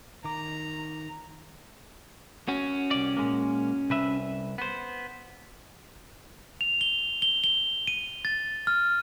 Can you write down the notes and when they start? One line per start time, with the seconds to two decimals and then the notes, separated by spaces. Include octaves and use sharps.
0.24 D#3 A#5 D6
2.48 C#4 F#4
2.91 C2 D5
3.17 A#2 G#3 A#3
3.90 C2 B4 E5
4.58 B3 C5
6.61 F7
6.81 G7
7.22 G7
7.44 G7
7.87 D#7
8.25 A6
8.67 F6